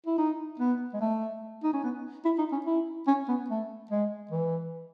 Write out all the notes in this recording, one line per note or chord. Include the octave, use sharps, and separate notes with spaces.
E4
D#4
B3
G#3
A3
D#4
C#4
B3
E4
D#4
C#4
E4
C#4
B3
A3
G#3
E3